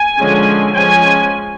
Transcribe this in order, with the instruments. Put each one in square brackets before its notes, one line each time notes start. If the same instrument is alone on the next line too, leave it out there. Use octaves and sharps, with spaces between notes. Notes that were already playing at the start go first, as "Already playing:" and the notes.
Already playing: [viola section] G#5
D3 F3 G#3 C#4
F3 G#3 C#4 G#5